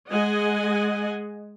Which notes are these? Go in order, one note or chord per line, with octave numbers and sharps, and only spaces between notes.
G#3 D#5 F#5 G#5